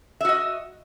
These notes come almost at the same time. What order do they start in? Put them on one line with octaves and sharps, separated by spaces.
E5 F#4 D#5